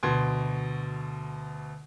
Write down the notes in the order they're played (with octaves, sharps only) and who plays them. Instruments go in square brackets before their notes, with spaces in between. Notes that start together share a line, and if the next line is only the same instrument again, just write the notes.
[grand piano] D2 B2 C6 G#6